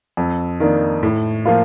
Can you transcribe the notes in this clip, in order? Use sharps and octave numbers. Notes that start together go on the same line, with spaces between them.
F2
D#3 A#3 D4
A2
F3 A#3 F4